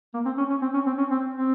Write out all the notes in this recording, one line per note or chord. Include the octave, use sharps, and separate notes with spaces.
A#3
C4
C#4
C#4
C4
C#4
C4
C#4
C4
C4